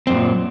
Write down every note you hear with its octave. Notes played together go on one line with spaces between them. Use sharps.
F#2 A#2 C4